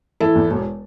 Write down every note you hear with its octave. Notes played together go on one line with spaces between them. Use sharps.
E3 E4 A4
E2
E1